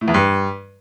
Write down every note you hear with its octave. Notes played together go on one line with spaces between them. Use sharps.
A2
E2
G2